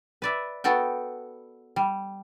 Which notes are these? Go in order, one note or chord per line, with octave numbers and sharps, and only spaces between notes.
B4 D5 E5
B3 F#4 A4 F#5 G5
G3